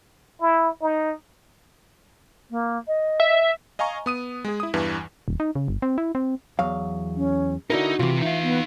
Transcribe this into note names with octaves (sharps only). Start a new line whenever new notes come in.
E4
D#4
A#3
D#5
E5
D#5 F5 G#5 A#5 C#6
B3 D#6 D#7
G#3 G#4
E4 D#6
E2 G2 E3
D#1
D#4
C#3
G1
C4
E4
C4
E2 F#3 F5
C#4
D3 D#4 E4 F#4 A#4
C3 E3 F4
D#4 E5 F5
B3